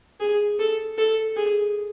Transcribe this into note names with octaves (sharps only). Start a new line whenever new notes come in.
G#4
A4
A4
G#4